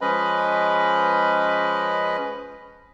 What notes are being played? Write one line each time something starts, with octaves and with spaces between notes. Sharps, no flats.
F3 G#3 C#4 B4 D#5 B5